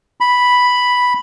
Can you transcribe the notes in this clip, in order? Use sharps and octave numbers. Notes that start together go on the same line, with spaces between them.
B5